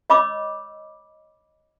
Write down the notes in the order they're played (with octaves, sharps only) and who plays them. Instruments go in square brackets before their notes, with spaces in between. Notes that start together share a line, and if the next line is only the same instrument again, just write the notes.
[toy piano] C#5 D#5 B5 D6 E6